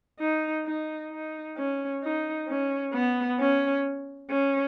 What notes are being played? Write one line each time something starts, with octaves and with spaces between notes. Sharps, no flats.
D#4
D#4
D#4
C#4
D#4
C#4
B3
C#4
C#4